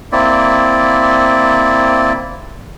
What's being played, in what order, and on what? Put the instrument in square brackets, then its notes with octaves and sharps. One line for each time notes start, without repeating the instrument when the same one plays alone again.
[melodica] A#3 C4 E4 D5